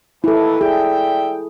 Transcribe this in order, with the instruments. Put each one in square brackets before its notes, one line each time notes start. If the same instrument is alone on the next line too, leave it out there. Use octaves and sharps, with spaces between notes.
[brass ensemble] D#2 E3 [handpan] E4 A4
[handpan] G#4 [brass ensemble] D5 E5 G5